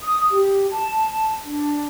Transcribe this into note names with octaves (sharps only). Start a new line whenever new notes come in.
D#6
G4
A5
D4